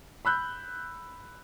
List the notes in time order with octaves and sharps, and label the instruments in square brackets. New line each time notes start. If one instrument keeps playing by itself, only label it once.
[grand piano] B5 E6 F#6 G6